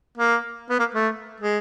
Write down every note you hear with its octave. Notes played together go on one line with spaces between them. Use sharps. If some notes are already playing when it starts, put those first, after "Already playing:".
A#3
B3
A#3
A3
G#3